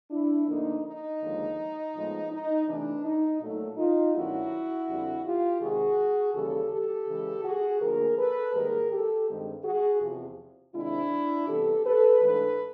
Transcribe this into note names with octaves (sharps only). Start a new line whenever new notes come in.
D4 E4
D2 D3 F3 A#3 D4 D#4
D#4
D#2 D3 F3 G#3
A2 F3 G#3 B3
D#4
C3 E3 A3 D4
D#4
A#2 F#3 A3
D#4 F4
G2 D#3 F#3 A3 C#4 E4 F#4
F2 D3 G3 C4
F4 G4
C3 D#3 G#3 F#4 G#4
D#2 C#3 E3 G3 G4 A4
G4 A4
C#3 E3 G#3
F#4 G#4
D2 D3 F3 A#3 G#4 A#4
A4 B4
G#2 D#3 G3 A#3 G#4 A#4
G4 A4
G2 D#3 G#3 C4
F#4 G#4
E2 C3 F3
C3 D#3 G#3 C4 D4 E4
C3 E3 G3 B3 G4 A4
A4 B4
G#2 E3 A3 D4 A4 B4